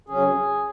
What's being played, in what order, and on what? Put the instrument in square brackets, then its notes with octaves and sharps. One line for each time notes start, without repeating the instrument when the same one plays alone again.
[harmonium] F#2 C#3 F#3 C#4 [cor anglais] G#4